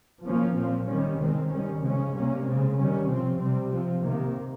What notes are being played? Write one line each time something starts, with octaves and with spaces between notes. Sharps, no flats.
F3 A#3 C#4
A#2 F3 C4
D#3 G3 C#4
D#3 G#3 C4
D#3 G3 C#4
C#3 F3 G#3 C#4
C3 G3 A#3 C#4
C#3 G#3 C4
D#3 G3 C#4
C3 F3 C4
C3 G3 C4
F3 C4
C3 D#3 A#3